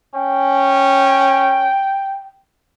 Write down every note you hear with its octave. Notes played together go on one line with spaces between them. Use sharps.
C#4 G5